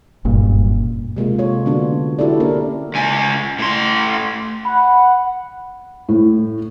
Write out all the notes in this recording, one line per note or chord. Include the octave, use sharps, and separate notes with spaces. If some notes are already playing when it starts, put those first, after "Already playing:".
F#1 G2 A#2
C3 G#3 A#3 F4
F4 A4 C#5
D3 B3 C#4 D4 F4 F#4
E4 F#4 G4 A4 D5
A#3 C#4 D4 A#4
C#2 G#5
A2 C6
F#5 B5
A2